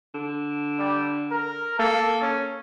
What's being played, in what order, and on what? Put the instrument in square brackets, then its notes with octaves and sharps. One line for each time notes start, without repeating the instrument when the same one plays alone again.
[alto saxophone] D3
[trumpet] G3
A#4
[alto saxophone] A#3 [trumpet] A4
[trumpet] C#4